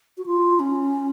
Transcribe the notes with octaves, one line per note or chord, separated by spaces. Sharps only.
F#4
F4
C#4